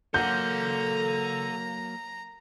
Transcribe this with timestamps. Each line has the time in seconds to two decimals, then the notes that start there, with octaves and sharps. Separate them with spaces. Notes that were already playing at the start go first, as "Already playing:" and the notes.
0.14 F#3 A#3 A4 F#5 A#5 G6